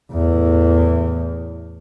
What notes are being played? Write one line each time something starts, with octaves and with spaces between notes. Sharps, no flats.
E2 A2